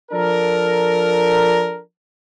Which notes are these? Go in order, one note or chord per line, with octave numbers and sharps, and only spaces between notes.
F3 D4 A4 A#4